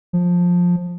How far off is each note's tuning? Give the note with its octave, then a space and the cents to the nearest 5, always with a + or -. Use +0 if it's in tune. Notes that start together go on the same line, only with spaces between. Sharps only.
F3 +15